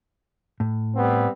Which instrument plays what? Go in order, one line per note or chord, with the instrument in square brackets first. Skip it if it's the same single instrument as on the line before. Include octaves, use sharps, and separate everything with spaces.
[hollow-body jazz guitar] A2
[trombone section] G3 B3 C4